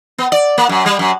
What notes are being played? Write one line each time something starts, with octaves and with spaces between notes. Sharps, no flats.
B3
D5
A#3
F#2
G3
F#2